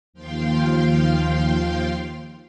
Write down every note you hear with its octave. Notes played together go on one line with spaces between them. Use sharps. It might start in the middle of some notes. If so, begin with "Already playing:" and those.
D#2 F3 F5 G5 C6